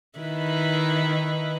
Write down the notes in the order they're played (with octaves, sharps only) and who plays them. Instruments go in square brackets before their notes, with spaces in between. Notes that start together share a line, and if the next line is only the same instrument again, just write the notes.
[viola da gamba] D#3 E4 B4